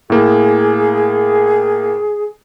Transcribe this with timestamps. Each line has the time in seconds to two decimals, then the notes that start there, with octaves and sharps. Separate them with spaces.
0.10 A2 A#3 G#4